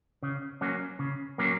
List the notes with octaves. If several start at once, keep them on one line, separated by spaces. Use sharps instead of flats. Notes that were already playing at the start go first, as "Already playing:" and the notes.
C#3
F#3 A#3 C#4
C#3
F#3 A#3 C#4